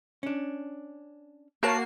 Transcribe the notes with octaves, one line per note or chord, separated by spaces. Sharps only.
C#4 D4
A#3 F#4 A#4 C#5 A5 C7